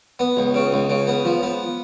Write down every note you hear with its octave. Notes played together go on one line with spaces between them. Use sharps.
B3
C#2
C#3
C#2
C#3
B3
F3
B3